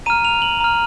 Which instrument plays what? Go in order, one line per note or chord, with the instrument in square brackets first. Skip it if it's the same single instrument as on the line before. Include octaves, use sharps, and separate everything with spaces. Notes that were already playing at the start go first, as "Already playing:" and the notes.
[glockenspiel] A#5 F6 D#7
F7
F#7
A#5 F6